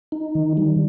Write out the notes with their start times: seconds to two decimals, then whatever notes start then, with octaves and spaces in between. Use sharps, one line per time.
0.12 D#4
0.35 D#3
0.57 G3